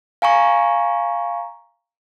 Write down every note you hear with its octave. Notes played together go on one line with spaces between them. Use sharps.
F5 G#5 A#5 C#6